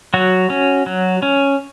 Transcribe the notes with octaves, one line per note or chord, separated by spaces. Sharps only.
F#3 F#4
C#4
F#3
C#4